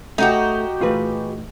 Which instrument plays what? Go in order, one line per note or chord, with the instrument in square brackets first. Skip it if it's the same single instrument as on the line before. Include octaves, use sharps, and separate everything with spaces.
[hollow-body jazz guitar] A3 [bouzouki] D#4 F#4 G4
[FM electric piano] A#2 E3 A3 [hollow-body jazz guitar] F4 G#4 B4